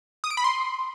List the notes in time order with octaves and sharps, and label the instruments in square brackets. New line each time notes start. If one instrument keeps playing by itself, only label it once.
[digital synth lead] D#6
D7
B5
C6